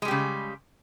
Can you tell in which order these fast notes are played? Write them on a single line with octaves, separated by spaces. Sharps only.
G#3 G3 G4 C#3